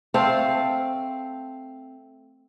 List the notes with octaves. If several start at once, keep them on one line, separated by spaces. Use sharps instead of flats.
A3 C4 F5